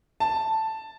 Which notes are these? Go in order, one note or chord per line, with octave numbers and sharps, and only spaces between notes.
A5